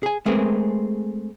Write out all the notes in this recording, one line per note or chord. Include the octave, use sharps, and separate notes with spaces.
G#4 G#5
G#3 A3 C4 G#4 A#4 B4